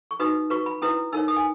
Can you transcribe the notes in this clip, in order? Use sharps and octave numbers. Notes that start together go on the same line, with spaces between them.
C#6
D#4 F#4 B4 D#6
F#4 B4 C#6
B5
C#4 E4 B4 D#6
D#4 A#4 C#5 E6
D#6
G#5